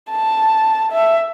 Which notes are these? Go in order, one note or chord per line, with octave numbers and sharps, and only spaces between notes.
A5
E5